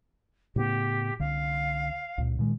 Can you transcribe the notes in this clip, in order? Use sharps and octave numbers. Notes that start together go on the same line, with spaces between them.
A2 C#3 B3 G4
C2 D3 F5
C#2 A#2
A#2 D#3 G#3